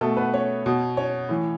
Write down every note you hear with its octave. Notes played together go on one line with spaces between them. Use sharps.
B2 A3 A4
B3 B4
C#4 C#5
B2
C#4 C#5
A2 E3